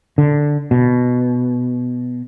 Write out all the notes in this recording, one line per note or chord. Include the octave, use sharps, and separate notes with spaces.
D3
B2